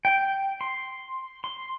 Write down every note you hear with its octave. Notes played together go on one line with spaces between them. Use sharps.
G5
C6
C6